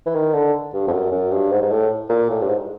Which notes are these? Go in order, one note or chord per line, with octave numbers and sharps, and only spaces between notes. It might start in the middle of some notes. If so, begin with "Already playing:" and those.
E3
D#3
D3
G2
F2
F#2
F#2
G2
G#2
G#2
A2
A#2
A2
G2
G#2